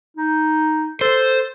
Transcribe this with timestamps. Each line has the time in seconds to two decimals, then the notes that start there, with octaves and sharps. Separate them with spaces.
0.17 D#4
1.01 A4 C5